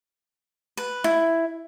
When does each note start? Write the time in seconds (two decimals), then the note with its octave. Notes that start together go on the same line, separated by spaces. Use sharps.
0.77 B4
1.04 E4